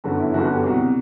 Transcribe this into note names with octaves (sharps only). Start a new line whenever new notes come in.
G1 F#2 D3 F#4
E4
G1 F#2 D3 F#4
F#4
G4
C2 B2 F#4